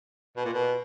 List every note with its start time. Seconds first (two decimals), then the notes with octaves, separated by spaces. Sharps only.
0.37 B2
0.45 A#2
0.53 B2